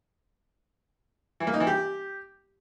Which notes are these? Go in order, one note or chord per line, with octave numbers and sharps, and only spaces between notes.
E3
A#3
D#4
E3
G4